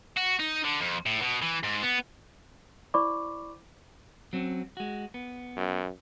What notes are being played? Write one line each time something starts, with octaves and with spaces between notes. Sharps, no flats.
F#4
D#4
D3
F2
A2
B2
E3
G#2
B3
E4 C5 D5 B5 C#6 D6
F#3 C4 C#4
G#3 F#4
B3
F#2